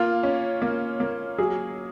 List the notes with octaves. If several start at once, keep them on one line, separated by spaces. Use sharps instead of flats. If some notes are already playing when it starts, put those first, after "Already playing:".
Already playing: A#3 F4
C#4
A#3
A#3
F#3 G#4